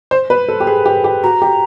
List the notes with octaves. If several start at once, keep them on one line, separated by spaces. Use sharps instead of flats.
C5
B4
A4
G4
G#4
G4
G4
F#4 A#5
G4